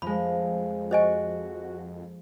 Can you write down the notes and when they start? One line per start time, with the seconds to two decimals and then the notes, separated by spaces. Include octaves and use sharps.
0.02 F2 F3 G#3 B5
0.91 F#4 C5 D#5 G#5